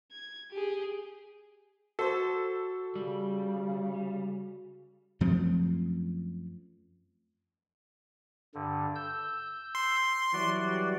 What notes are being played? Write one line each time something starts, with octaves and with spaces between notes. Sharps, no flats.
G#6
G4 G#4
F#4 A4 C5
C#3 G3
F#2 F3 A3 C4
G2 D3
E6 G6
C6
E3 F#3 G3 F#4 D5